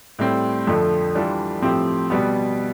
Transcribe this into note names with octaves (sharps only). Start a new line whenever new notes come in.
A2 G3 C4
F2 D3 F3 A3
E3 G3 D4 F4 A4
A2 F3 C4 G4
B2 G3 B3